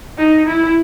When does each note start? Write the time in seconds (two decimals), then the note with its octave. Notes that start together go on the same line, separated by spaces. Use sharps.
0.18 D#4
0.47 E4